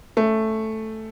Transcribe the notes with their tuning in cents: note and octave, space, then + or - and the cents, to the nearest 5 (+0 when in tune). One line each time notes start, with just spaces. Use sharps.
A3 +0 C#4 +5